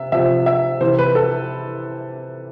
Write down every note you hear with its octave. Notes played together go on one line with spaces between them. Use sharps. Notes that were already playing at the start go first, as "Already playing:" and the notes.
Already playing: C3 E5
C3 F3 E5
E5
C3 E3 C5
B4
A4